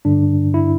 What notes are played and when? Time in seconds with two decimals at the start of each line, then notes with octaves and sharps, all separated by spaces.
0.05 G2 D3 D4
0.54 E4